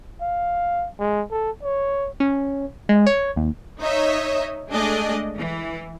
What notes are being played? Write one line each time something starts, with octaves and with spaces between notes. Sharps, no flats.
F5
G#3
A4
C#5
C#4
G#3
C#5
D#2
D#4 C#5 D#5 E5
G#3 A3 D4 G#4 D5 D#5
E3